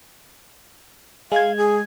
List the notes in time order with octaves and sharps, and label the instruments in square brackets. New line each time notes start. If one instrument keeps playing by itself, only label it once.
[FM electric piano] G#3 G#6 [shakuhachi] F5
[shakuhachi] G#4